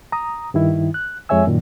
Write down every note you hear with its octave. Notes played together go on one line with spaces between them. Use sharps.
A#5 D#6
G2 D#3 E4
F#6
F2 G#3 C#5 E5 G#5 E6
F#2 A#2 D#3